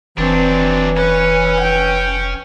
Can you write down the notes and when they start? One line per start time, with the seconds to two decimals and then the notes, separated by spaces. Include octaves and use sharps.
0.18 F1 E3 F#3 C4 D4
0.97 C#4 B4
1.60 G5